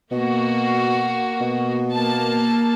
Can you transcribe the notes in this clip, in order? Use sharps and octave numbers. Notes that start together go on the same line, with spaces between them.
B2 A#3 F#4
B2
A#3 A5